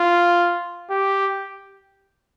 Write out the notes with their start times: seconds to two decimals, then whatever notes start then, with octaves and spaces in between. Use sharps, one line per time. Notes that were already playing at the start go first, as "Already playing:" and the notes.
Already playing: F4
0.90 G4